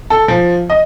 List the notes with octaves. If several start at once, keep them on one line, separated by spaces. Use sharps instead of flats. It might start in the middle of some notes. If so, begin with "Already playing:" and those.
A4
F3
D#5